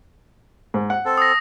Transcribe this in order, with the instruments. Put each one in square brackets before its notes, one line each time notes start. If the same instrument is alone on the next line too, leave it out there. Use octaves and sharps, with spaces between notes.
[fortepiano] G#2
F#5
[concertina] C4 A4
[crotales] D#6 A#6